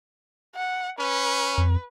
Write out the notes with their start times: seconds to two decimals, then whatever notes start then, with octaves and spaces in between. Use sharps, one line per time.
0.55 F#5
0.99 C#4 B4
1.58 F2